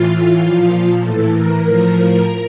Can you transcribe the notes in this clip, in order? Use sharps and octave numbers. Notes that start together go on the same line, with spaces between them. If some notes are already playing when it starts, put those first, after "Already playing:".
Already playing: A2 E3 F4
A#2 F3
A2 E3 A4
A#4
A2 F3